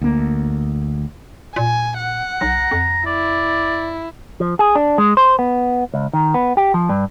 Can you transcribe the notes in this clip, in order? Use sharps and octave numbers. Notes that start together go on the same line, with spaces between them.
D2 A#3
A#2 G#5
F#5
B1 A#5
F2
E4 D5
F3
G#4
D4
G#3
C5
B3
C#2
D#3
B3
G4
F3
G2